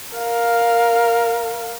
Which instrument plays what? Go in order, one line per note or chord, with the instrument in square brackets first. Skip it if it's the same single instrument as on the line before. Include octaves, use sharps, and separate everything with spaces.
[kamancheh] A#4 F5